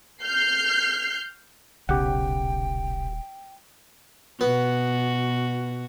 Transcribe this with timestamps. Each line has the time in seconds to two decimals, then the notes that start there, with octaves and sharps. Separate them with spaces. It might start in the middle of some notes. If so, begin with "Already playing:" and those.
0.22 F6 G6 C7
1.89 D#1 B1 C#3 G4 F#5 G5
4.41 B2 B3 F#4